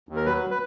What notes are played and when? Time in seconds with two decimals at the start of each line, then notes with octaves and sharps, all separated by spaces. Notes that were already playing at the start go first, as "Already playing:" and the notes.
0.09 D#2
0.16 A#4
0.26 F#3 B4
0.51 B4